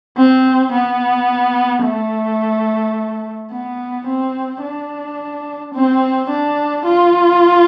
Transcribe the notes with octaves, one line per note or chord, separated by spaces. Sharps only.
C4
B3
A3
B3
C4
D4
C4
D4
F4